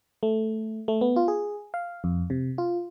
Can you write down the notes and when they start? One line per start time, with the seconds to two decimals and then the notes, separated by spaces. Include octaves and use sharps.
0.23 A3
0.88 A3
1.01 B3
1.16 F4
1.28 G#4
1.74 F5
2.04 F2
2.30 C3
2.58 F4